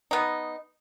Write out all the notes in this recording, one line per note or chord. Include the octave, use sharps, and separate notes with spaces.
B3 D#4